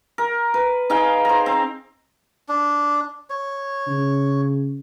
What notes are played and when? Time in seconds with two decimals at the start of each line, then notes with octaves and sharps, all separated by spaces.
0.18 A#4
0.54 B4
0.90 D#4 G#4 F5 G5
1.25 C5 A#5
1.46 C4
2.49 D4
3.30 C#5
3.88 C#3